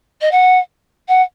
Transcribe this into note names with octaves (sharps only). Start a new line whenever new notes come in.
D#5
F#5
F#5